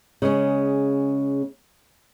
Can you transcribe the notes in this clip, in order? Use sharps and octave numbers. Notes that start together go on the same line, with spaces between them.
C#3 G#3 C#4